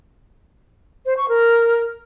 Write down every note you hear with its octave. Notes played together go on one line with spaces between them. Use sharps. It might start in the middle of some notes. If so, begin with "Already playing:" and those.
C5
C#6
A#4